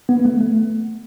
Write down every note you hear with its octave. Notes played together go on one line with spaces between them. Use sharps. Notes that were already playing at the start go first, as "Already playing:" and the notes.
B3
B3
A3
A3